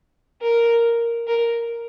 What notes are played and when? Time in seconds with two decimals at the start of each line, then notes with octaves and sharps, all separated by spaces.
0.42 A#4
1.27 A#4